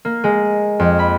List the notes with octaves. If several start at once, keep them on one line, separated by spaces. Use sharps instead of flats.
A#3
G#3
F2
B5